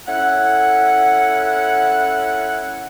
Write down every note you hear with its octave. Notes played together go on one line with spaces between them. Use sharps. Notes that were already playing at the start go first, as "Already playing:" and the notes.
C#4 E4 A4 F#5